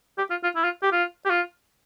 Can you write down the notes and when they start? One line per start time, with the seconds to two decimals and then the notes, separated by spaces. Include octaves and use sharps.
0.18 G4
0.30 F4
0.43 F4
0.56 E4
0.64 F4
0.82 G4
0.92 F4
1.25 G4
1.30 F4